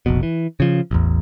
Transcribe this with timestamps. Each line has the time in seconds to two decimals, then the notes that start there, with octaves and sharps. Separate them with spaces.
0.06 F1 A#1 B2
0.23 E3
0.60 C#3 F3
0.91 A1 E2